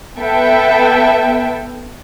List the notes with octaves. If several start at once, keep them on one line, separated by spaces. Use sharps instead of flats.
B3 A4 B4 E5 G5 A5